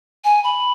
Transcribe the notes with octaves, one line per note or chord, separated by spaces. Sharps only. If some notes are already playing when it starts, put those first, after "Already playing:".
G#5
B5